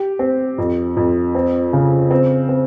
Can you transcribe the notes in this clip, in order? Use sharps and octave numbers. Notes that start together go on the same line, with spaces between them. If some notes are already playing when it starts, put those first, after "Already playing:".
Already playing: G4
C4
F2
F2
C4
C#3
C4
C4